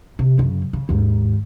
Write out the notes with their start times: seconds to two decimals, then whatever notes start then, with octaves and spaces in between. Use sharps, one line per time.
0.19 C3
0.38 F#2 C#3
0.73 C#3
0.89 D#2 G#2